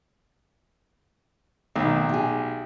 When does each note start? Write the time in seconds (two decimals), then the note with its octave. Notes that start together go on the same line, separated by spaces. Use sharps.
1.76 B1 D#3 A3
2.09 G4 G#4